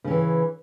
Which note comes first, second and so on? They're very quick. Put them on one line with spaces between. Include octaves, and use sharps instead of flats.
C#3 C#4 E3